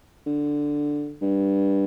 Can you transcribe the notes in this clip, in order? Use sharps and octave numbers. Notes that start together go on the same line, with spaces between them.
D3
G2